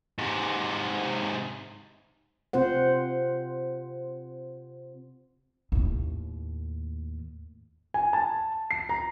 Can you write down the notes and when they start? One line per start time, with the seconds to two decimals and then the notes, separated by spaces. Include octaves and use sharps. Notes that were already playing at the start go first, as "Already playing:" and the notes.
0.19 G#2 C3
2.53 C3 C4 F4 C5 F#5
5.72 D#2 A2
7.94 G#5
8.13 A5
8.71 C7
8.89 A#5